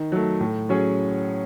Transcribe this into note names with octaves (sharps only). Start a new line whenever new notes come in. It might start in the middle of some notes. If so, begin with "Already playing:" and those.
Already playing: D#3
F#3 A3
A2
F#3 C#4 G#4